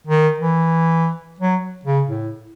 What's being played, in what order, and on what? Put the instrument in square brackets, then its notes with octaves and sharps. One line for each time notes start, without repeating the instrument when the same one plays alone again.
[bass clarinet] D#3
E3
F#3
C#3
A2